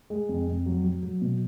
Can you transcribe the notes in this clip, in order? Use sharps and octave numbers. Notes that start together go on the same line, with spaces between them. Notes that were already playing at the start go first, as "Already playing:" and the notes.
G#3
F2
F2
F#3
F#3
F#3
B2